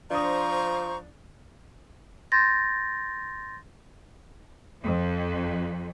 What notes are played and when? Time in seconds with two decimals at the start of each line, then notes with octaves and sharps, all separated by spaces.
0.10 F3 D4 C5 A#5 C#6 D#6
2.32 C6 G6 A6 A#6
4.83 F2